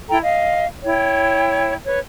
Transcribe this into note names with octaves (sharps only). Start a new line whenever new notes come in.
E4 A4 G5 A#5
D#5 F5
E4 C#5 G5
B4 C#5